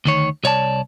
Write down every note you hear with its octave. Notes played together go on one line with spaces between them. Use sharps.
D2 D#3 C#5
C2 C#5 D5 A5